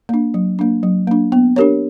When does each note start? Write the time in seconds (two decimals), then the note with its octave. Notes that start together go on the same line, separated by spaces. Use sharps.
0.09 A#3 D4
0.34 F#3
0.59 A#3 D4
0.83 F#3
1.07 A#3 D4
1.32 B3
1.56 D4 G4 A#4 C#5